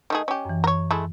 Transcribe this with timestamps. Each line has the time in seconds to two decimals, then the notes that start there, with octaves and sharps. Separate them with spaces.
0.10 D#3 A3 G#4 D#5
0.28 C#4 G4
0.45 F#2 E3
0.64 A#4 C#5
0.91 G#3 A3 E4